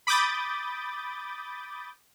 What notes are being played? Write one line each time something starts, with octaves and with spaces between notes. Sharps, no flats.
B5 D6 D#6 G6 A6